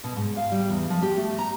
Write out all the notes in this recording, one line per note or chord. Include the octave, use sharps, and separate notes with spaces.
B2
G#2
F5
G3
E2
F3
G4
A3
A#5